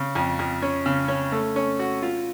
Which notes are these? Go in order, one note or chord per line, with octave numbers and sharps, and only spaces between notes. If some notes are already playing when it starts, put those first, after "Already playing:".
Already playing: C#3
F2
F2
C#4
C#3
C#4
A3
C#4
F#4
F4